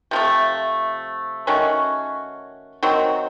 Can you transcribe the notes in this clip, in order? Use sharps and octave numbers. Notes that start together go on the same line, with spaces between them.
C3 F3 A3
D#3 A3 C#4 F#4
D#3 F#3 C4